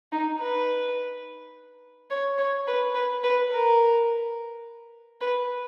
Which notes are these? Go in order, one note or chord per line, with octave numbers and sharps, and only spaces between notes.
D#4
B4
C#5
C#5
B4
B4
B4
A#4
B4